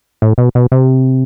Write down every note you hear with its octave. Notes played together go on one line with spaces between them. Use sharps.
A2
B2
B2
C3